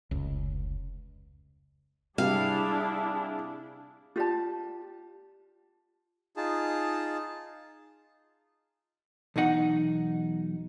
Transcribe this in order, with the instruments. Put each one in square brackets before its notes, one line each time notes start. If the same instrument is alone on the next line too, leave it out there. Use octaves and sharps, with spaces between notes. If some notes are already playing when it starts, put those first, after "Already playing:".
[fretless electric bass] F1 C#2
[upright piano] C3 G3 [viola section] D4 E4 G#4 [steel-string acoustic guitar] F5
[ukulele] F4 G4 D5 A5
[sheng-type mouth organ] D#4 F4 G#4 A5
[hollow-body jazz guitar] B1 E2 B2 D#4 F#5